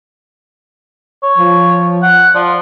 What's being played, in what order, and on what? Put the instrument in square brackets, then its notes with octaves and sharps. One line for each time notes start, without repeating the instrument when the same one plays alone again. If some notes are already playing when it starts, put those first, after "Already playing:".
[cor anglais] C#5
[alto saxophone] F3
[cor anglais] F#5
[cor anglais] F3 [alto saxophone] D5